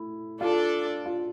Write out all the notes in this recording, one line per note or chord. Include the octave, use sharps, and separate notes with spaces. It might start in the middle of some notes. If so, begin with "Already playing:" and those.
Already playing: A3 E4
D4 F4 A4 D5
F4